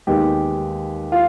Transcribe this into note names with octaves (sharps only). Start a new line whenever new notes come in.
D#2 D#3 G#3 B3 G4
F4